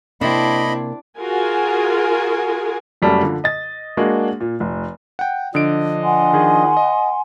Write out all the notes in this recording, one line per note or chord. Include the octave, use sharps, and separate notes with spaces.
C3 A#3 C4 D4 E4 D#5 B5
F4 F#4 G#4 A#4 G#5
F#1 F#2 G3 A3 C#4 A4
D3 F3
D#5 A6
G#3 A#3 D4 F#4
A#2
F1
F#5 G5
D3 F3 D4 D#5 D7
F#5 G#5 C6
D#3 G#4
D#5